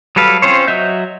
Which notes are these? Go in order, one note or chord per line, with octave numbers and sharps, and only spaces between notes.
F#3 G3 A4 B4 F5
C4 C#4 F4 C5 C#5
F#3 D#5 E5 G6